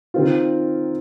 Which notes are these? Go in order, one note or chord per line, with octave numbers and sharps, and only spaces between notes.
D#3 C4 F4